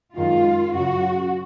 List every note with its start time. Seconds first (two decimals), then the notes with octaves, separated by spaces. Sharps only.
0.15 F#2 D#3 G#3 F4
0.74 F#2 C#3 F#3 F#4